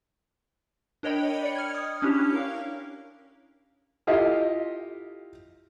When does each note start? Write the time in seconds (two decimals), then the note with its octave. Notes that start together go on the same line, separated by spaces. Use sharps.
1.03 D4 A#4 C#5 D#5 G5 B5
1.42 D5 C#7
1.55 F6 G#6
1.74 D#6
2.02 C#4 D4 E4 G4 C#5
2.34 A#4 F5
4.07 E4 F4 G4 A4 D#5 F5